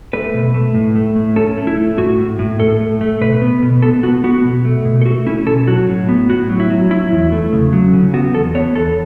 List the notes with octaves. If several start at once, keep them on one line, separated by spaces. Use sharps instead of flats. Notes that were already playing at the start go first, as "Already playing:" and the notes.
A3 B4
B2
A3
A2
A3
A2
C#4 A4
A3
E4
A3
A2 F#4
A2
A2
A2 A4
A3
A3
B2 B4
B3
B2
B3 A4
B3 F#4
B3 F#4
B2
A3
B2
A4
A3 F#4
C#4 E4
B2 A4
F#3 F#4
A2
B3
A2 F#4
F#3
E4
F#3
F#3 E4
E2
A3
C#3
F#3
C#3
B3 F#4
E2 A4
B3 C#5
E2 A4